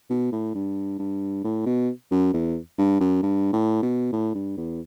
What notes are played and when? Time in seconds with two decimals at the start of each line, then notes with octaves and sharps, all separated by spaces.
0.10 B2
0.32 A2
0.54 G2
0.99 G2
1.44 A2
1.66 B2
2.11 F#2
2.33 E2
2.78 G2
3.00 F#2
3.23 G2
3.53 A2
3.82 B2
4.12 A2
4.35 G2
4.57 E2